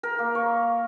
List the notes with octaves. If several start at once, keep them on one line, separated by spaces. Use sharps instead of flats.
A#4
A#3
C#5